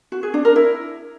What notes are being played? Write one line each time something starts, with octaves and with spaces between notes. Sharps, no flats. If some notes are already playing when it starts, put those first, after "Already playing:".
F#4
G#4
D4
A#4
E4